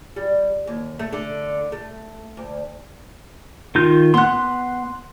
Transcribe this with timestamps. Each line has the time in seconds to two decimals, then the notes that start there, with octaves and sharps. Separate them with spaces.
0.16 G3
0.67 D#2
0.99 A3
1.13 D3
1.72 A3
2.37 D2
3.75 D#3 F4 G6
4.14 B3 F#5 C6 F#6